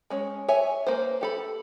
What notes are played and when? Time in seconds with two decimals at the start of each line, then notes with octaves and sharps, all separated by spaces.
0.10 G#3 C#4 C#5
0.48 C#5 E5 G#5
0.87 A#3 B4 C5
1.21 G4 A4 B5